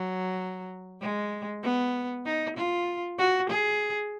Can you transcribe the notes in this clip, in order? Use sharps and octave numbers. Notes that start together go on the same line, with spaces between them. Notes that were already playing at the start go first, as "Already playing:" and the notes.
Already playing: F#3
G#3
B3
D#4
F4
F#4
G#4